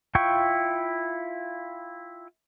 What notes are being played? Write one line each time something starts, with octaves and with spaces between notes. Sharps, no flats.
E4 F4 G5 C#6